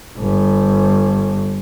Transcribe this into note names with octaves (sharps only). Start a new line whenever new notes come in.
G1